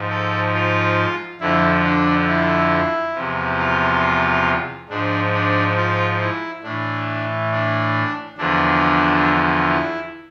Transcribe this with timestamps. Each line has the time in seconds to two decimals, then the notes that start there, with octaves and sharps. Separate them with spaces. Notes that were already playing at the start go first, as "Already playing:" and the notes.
Already playing: G#2 F3
0.10 A4
0.54 F4
1.41 F2 D3 F3 E4
1.84 D4
2.28 E4
3.15 E2 C3 F3
3.59 F4
4.89 G#2 F3 D4
5.33 D4
5.77 F4
6.21 E4
6.63 A2 E3 D4
7.51 D4
8.37 E2 D3 F3 D4
9.69 E4